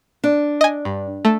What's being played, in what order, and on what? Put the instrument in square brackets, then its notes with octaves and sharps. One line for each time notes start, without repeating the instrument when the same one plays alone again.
[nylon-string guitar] D4
[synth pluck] D#5 G#5
G2
A3